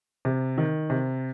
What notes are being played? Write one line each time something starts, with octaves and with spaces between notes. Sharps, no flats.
C3
D#3
C3